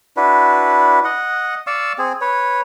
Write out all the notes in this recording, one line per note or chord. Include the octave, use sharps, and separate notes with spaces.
D4 E4 F#4 B4
D#5 F#5
D5 F5 C#6 E6
C4 G#4
B4 C#5